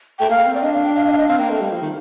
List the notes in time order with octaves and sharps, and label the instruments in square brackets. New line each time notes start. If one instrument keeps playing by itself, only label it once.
[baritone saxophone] A3 [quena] G5
[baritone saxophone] A#3 [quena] F5
[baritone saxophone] C4
[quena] D5
[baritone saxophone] D4 [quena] D#5
[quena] F5
G5
F5
D#5
F5
D#5
[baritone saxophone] C4 [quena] F5
[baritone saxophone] A#3 [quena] G5
[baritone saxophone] A3
G3
F3
D#3